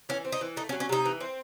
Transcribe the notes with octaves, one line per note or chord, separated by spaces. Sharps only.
E3 C#4
C4
D#4
E3
A3 D#4
C#4
F#3
C#4
C3 D#4
E3
C4